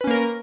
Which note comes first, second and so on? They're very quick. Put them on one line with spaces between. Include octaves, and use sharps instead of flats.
B4 C#4 A#3 A#4